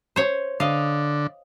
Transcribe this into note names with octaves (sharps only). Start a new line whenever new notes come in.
C5 C#5
D3 D#5 F5